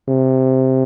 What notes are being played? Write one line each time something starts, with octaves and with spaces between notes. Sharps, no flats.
C3